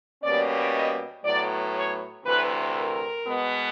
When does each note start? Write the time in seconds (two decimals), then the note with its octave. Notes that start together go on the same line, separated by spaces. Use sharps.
0.23 B2 G3 A#3 C#4 D5
0.74 D#5
1.25 A2 F#3 B3 D5
1.76 C#5
2.25 D2 C3 E3 B4
2.76 A#4
3.26 B2 G#3 B3